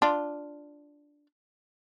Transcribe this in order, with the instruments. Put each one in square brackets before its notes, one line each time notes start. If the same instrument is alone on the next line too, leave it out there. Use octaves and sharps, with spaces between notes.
[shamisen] D4 F4